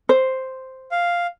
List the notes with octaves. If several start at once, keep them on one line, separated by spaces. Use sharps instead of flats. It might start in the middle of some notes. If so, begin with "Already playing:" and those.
C5
F5